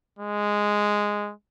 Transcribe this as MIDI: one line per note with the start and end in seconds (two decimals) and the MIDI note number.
0.19 1.32 56